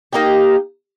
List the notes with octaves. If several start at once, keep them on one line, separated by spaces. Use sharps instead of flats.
A#3 D#4 G4